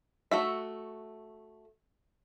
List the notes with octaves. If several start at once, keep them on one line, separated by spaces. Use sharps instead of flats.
A3 F#4 E5